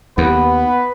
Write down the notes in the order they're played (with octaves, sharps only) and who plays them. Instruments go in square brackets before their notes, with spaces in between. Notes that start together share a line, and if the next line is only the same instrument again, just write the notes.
[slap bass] D#2 [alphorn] B3 [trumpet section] B4